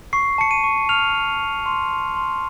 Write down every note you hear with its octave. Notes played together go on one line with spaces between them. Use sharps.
C#6 C7
A5 C#7
D#7
C#6
F6 F7
F6
C#6
C6
C6
C6